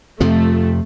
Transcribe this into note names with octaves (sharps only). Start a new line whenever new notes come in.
F2 C3 F3 A3